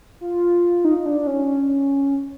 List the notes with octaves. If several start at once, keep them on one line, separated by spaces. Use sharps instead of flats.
F4
D#4
D#4
D4
C#4